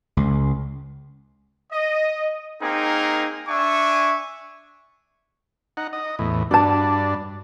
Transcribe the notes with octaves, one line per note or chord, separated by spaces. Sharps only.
C#2
D#5
A#3 C4 D#4 G#4 A#4
D4 E5 G#5 C#6
D#4 F#5
D#5
E2 A2
G2 D4 F#4 A5